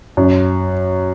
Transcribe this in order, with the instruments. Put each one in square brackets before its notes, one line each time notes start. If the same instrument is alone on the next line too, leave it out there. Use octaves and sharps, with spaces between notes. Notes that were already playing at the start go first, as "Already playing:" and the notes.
[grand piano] F#2